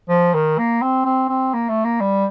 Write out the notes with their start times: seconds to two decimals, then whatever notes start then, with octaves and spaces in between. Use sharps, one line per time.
0.09 F3
0.34 D#3
0.58 A#3
0.82 C4
1.05 C4
1.29 C4
1.54 A#3
1.69 A3
1.84 A#3
2.00 G3